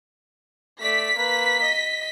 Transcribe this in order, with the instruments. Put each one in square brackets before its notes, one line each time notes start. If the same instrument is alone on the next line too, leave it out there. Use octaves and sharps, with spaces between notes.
[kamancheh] A3 D5 [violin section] B6
[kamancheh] A#3 B4
D#5